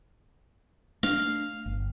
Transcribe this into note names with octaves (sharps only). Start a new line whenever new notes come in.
A3 D4 F5
G1